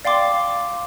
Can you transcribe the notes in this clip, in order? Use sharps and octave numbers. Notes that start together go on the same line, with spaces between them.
D5 F5 G5 C6 D6